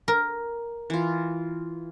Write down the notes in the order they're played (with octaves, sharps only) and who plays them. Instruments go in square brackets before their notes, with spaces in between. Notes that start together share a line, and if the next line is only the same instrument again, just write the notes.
[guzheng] A#4
[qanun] E3 F4